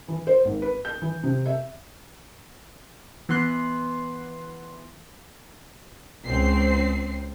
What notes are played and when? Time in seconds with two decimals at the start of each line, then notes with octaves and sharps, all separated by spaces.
0.08 E3
0.27 C5
0.45 G#1
0.62 B4
0.85 G6
1.02 E3
1.23 C3
1.46 E5
3.29 E3 B3 C6 F#6
6.25 C#2 C4 C7